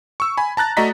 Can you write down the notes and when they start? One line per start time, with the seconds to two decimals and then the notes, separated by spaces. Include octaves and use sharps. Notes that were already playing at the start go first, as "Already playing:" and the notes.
0.20 C#6 E6
0.37 G#5 B5
0.57 A5 A#5 F#6 A6
0.77 A3 F#4 D5 D#5 A#5 B6